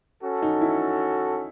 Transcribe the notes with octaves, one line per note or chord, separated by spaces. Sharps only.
C#4 F#4 A4
D#4
E4